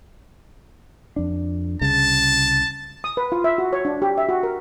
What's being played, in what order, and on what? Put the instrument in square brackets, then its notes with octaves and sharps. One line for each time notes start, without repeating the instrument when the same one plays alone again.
[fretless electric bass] F2 D4
[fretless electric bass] C2 C#3 [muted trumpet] A5
[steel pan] D#6
B4
F4
E5
F#4
C#5
D4
G4
E5
F#4
A#4